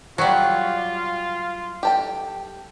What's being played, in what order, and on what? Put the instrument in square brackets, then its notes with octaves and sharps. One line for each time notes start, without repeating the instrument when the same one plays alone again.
[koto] F#3 G3 [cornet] F4
[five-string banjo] G4 A4 G5